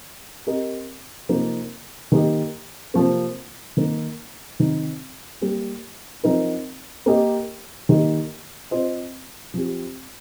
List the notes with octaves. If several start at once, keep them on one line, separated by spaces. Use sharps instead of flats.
C4 G4 A#4 D#5
C3 F3 A#3 D#4
D#3 A#3 G4 D#5
C3 F3 A#3
D#3 A#3 D#4
C3 D#3 C4 D#4
G3 A#3 G4
F3 C4 D#4 A#4
A#3 G4 A#4 D#5
D#3 A#3 G4 D#5
C4 F4 C5 D#5
F3 C4 G4